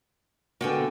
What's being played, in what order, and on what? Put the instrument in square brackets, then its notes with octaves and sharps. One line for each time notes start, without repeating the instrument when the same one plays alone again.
[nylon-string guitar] D3 B3 F#4 [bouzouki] A#3 G5 G#5